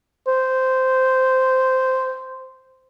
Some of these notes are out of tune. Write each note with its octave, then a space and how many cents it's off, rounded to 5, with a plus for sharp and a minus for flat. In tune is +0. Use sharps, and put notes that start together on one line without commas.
C5 -10